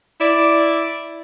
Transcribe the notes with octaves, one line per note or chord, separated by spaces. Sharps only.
E4 D5